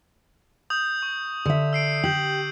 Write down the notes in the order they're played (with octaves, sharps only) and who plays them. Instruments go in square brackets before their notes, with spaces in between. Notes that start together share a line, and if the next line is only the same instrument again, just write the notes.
[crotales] D#6 G6 F7
C#6
[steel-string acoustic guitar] D3 E5
[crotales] E6 C7 D7
[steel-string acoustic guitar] G4 [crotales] G6 F#7